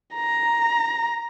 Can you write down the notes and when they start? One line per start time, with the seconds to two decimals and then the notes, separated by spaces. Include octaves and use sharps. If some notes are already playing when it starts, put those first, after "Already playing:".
0.14 A#5